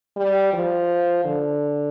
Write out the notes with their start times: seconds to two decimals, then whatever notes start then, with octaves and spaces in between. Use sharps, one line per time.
0.17 G3
0.53 F3
1.25 D3